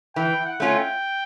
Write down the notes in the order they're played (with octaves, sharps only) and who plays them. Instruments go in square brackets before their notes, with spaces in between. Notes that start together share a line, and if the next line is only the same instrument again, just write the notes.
[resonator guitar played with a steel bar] E3 [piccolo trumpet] G5
[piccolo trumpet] F#5
[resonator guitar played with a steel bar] A3 C#4 F4
[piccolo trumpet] G5